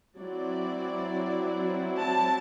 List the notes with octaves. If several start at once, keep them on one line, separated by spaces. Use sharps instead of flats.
F#3 C4 E4 D5
A5